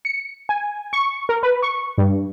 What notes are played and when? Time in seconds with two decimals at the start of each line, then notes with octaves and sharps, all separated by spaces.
0.05 C#7
0.49 G#5
0.93 C#6
1.29 A#4
1.43 B4
1.62 C#6
1.98 G2